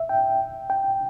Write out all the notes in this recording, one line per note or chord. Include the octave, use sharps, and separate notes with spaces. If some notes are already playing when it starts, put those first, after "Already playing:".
Already playing: E5
G5
G5